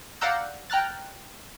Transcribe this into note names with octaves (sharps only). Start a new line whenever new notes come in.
D5 F5 F#5 A#5 E6 G6
G5 A#5 F6 F#6 A6